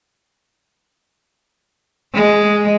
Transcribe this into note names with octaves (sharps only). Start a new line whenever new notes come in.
G#3